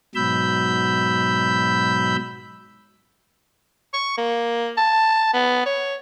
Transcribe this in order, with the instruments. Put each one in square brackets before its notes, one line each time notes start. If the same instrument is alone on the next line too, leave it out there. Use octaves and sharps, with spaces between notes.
[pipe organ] G#2 B2 F#3 B5 E6 G6
[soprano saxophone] C#6
A#3
A5
B3
C#5